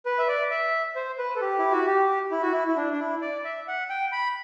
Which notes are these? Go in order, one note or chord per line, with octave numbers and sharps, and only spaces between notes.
B4
E5
D5
E5
C5
B4
A4
G4
E4
F#4
G4
E4
F#4
E4
E4
D4
D4
E4
D5
E5
F#5
G5
B5